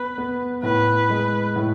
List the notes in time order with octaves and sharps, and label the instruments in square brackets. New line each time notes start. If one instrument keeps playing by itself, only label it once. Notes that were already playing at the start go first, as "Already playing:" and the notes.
Already playing: [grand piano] B3 [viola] B4
[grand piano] B3
[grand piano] A2 [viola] B4
[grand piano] G#3
A2